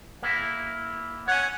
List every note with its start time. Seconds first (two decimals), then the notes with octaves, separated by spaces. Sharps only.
0.22 A#3 E4
1.28 C#5 F#5 G#5